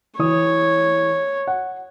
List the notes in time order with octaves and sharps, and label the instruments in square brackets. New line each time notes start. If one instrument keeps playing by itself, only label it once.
[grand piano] E3 D#6 [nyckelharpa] C#5
[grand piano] F#5